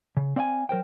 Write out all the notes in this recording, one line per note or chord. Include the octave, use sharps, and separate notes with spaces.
C#3
C4 D5 F5 G5 G#5
F#3 A#4 C5 G5